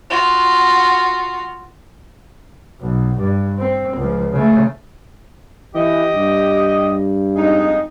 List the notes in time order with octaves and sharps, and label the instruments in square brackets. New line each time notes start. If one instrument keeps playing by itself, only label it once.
[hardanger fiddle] F4 F#4
[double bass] B1
G2
C4
C#2 F3
C#3 A3
[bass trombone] E3 [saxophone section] G4 D#5
[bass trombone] G2
[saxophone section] F2 G#3 D#4